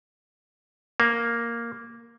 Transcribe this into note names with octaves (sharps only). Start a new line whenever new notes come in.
A#3